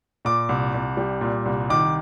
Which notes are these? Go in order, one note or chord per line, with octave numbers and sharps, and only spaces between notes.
A#2 D6
C2
C2
G3
A#2
C2
D#3 D6